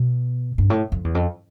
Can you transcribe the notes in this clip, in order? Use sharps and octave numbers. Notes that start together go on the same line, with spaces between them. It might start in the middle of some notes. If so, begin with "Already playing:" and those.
Already playing: B2
G2
A2
F2
E2
F2